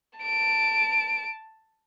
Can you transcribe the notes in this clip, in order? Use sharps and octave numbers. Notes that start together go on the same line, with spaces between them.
A5 D7